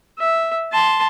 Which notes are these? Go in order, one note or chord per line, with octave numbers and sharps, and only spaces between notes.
E5
A5 C6